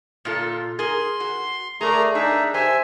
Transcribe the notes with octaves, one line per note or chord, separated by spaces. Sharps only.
A#2 F4 A4
G#4 A#4 C6
F#4
A3 G#4 A#4 D5 A#5
D4 D#4 G#4 E5
G4 C5 E5 G#5